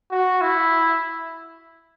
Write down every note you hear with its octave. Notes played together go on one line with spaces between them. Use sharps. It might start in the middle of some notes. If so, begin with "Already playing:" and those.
F#4
E4